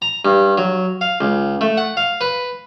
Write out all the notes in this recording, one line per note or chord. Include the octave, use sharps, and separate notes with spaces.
A#5
G2
F#3
F5
C#2
A3
F#5
F5
B4